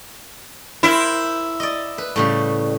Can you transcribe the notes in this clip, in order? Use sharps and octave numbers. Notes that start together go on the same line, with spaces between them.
E4 A#4 C5 G5
D5 D#5
B4
A2 C#3 G3